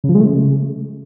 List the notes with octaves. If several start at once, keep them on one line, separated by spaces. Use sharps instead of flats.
C#3
F3
G#3
A3
C#3